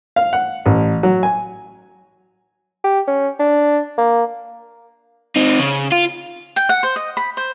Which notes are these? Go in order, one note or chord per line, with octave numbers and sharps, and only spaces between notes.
F5
F#5
A1
F#3
G#5
G4
C#4
D4
A#3
C4 D#4
C#3
F4
G5
F#5
C5
D#5
B5
C5